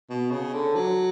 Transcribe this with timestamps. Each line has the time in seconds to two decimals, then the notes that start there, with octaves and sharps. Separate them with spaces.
0.10 B2
0.31 C#3
0.54 D3
0.75 F#3